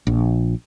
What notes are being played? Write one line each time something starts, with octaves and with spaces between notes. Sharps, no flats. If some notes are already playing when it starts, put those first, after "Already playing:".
A#1